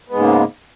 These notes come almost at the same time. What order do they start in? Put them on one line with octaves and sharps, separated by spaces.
B3 G#3 G#2 C#3 A#3